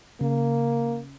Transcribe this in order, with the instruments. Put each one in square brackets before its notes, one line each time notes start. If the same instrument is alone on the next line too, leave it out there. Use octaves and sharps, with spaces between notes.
[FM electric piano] C#3 [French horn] A#3